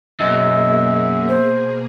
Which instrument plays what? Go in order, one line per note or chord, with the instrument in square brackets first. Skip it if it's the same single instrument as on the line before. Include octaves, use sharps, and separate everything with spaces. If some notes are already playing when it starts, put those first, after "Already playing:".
[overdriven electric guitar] F#2 [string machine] B2 A#3 G#4 [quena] D#5 [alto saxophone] E5
[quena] C5